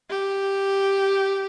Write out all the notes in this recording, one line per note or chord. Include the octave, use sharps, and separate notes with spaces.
G4